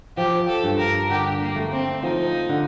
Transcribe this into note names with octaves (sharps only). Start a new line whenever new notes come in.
F3 G4
A4
G2
A#4
D3 G4
A#3
A3
C4
F3 D#4
D3